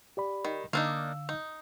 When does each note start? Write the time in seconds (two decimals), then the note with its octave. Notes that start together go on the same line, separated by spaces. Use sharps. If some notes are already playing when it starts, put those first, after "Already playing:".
0.17 G4 D5 B5
0.45 D#3
0.73 D3 A#3 D4 D#4 F5 E6
1.29 D#4